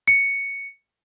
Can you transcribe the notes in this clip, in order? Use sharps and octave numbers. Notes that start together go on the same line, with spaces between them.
C#7